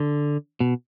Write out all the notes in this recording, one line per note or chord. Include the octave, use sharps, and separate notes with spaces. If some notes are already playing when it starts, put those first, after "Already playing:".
Already playing: D3
B2